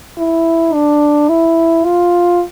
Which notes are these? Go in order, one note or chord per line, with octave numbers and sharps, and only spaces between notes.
E4
D4
E4
F4